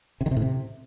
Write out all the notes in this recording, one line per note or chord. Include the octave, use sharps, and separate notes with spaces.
C3
D#3
C3
A2
C3